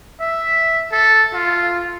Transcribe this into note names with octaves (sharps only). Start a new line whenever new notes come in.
E5
A4
F4